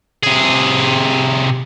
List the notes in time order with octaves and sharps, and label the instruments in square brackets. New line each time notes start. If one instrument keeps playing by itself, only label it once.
[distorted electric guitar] C3 G#4